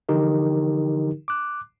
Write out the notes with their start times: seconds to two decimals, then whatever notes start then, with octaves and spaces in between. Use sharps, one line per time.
0.09 D3 E3 F3 D#4 G4 A#4
1.28 D6 F#6